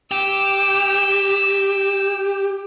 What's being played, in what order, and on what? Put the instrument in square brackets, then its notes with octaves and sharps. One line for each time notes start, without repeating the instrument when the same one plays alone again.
[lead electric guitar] G4 [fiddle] E6